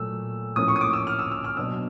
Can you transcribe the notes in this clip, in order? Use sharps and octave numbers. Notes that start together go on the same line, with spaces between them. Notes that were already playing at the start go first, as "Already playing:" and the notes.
Already playing: A#2 F#3 A3 E6
A2 F3 A#3 C#4 D#6
C#6
D#6
D6
E6
F6
E6
E6
F6
B2 F#3 B3 D4 E6